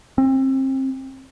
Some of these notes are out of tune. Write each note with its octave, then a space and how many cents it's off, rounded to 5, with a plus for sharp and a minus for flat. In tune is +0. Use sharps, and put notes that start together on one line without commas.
C4 +30